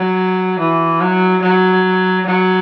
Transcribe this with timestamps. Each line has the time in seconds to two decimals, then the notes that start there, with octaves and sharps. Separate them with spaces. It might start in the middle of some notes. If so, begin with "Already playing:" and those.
Already playing: F#3
0.59 E3
1.01 F#3
1.42 F#3
2.26 F#3